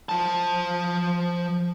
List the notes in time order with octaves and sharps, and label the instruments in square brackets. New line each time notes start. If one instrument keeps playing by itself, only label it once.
[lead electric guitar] F3 A5